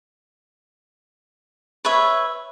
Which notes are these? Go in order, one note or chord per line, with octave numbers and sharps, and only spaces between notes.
B4 C#5 E5